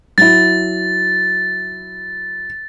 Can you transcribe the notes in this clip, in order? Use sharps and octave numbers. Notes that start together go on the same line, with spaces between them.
F#3 E4 A6